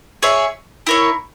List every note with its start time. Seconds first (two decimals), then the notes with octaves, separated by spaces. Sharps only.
0.23 G#4 C#5 E5
0.87 E4 A#4 C#5